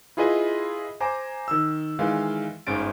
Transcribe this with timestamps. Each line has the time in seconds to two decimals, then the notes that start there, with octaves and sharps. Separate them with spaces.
0.17 E4 F4 G#4 B4 D#5
1.00 C5 G#5 A#5 D6
1.48 D#3 E6
1.99 D#3 E3 G#3 F5
2.67 G1 G#2 C#4 A6 D7